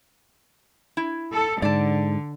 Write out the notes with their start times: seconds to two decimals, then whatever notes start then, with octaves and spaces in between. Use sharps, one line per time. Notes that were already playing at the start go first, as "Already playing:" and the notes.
0.97 E4
1.32 A4
1.62 G#2 D3 D5 A5